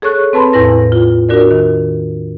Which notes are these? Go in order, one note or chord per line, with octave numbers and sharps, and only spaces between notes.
G#4 A4 C#5 C#6 F#6
C4 B4 A5 B5 C6
E2 A2 E4 B4 A#6
F4
D4 F#4 A#4 D5
D#3